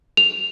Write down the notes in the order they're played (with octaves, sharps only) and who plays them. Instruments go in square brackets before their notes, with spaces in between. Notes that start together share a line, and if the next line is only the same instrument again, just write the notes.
[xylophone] F7